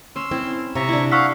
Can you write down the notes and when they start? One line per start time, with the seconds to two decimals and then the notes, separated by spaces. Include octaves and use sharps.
0.16 C#4 C6 E6
0.31 C4 E4
0.75 C3 E5 A#5 C#6
0.89 D4 E4
1.12 F5 F#5 C#6 E6 B6